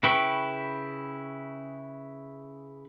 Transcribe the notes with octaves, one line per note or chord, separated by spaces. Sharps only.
C#3 E4 B4 G5 C#6